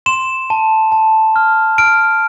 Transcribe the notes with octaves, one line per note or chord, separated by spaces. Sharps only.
C6 E7
A5
A5
F6
F6 D7